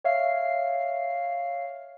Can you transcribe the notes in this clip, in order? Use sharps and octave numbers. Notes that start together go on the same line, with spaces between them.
C#5 E5 F5 C7